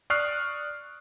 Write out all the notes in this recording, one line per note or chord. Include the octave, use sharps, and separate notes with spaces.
D5 C#6 D#6 F6 F#6 C7